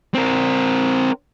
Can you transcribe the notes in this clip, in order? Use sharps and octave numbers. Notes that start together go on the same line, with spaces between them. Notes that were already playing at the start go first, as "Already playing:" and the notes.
C4 A#4